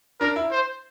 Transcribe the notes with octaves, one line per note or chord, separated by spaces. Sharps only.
D4 A#4
E4
C5